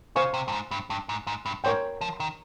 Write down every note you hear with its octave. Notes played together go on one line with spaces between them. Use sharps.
C#3 C5 F5 G#5 C#6
C3
G2
G#2
G2
G2
G#2
G#2
G2
G#2 A#4 C#5 G5
F3
D#3